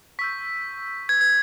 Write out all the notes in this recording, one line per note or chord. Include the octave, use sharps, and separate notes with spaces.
C#6 E6 G6 B6
G#6
G#6